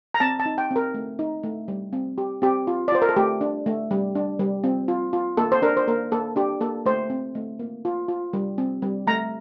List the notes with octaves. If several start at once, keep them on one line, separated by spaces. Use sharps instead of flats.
A#5
C4 A5
A5
D#4
G5
C4 A#4
A3
D#4
A3
G3
C4
G4
C4 G4
F4
D5
F4 C5
A#4
A4
A3 G4
D4
A3
G3
D4
G3
C4
F4
F4
A#3 A4
C5
D4 A#4
C5
A#3 A#4
A#3 A4
D4 G4
A#3 A4
A3 C5
C4
A3
A#3
F4
F4
G3
C4
G3
A3 A#5